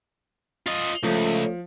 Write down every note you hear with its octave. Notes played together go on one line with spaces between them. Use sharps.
F4 D#5
C#2 F3 A3